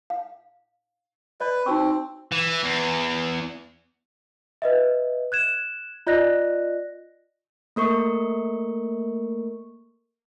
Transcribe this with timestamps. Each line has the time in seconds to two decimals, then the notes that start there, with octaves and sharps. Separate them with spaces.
0.10 F5
1.40 B4 D5 D#5
1.66 C4 D#4 F#4 C#6
2.32 E3
2.64 E2
4.62 B4 D#5 E5
5.32 F#6 G#6 E7
6.07 F4 D5 D#5 F#6 A#6
7.76 A3 A#3 A#4 C#6